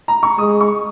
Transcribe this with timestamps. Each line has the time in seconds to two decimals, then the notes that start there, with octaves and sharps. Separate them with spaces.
0.08 A#5
0.23 C#6
0.38 G#3 D#6
0.61 C#6